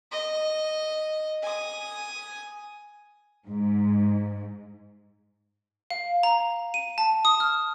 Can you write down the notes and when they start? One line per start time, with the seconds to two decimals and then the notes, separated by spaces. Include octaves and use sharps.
0.12 D#5
1.43 G#5 D#6
3.46 G#2
5.90 F5
6.23 A#5
6.74 D#7
6.98 A5
7.25 D#6
7.40 F6